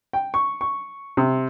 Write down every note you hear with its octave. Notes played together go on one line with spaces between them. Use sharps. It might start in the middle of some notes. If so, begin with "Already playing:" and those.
G5
C#6
C#6
C3